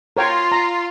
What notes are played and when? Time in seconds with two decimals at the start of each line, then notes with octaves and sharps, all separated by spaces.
0.17 F4 A#4 C#5 G5
0.52 A#5